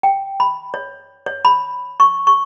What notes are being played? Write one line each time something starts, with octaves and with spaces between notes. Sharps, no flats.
G5
B5
C#5
C#5
B5
C#6
C#6